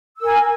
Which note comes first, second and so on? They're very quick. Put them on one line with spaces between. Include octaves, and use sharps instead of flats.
E6 A#4 G#5